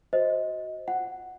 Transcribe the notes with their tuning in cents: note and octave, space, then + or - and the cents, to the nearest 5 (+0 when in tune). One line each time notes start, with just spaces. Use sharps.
F#4 +0 C5 +0 D#5 +15
F4 +0 F#5 +0